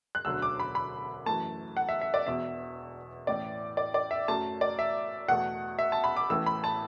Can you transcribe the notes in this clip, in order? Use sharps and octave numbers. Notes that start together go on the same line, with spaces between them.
F#6
E1 D2 D3 F#3 E6
D6
B5
B5
F#2 E3 A3 A5
F#5
E5
E5
D5
E1 E2 B2 E5
A1 A2 E3 D5
D5
D5
E5
F#2 F#3 A3 A5
D5
E5
E2 B2 A3 F#5
E5
A5
B5
D6
A1 A2 E3 A3 E6
B5
A5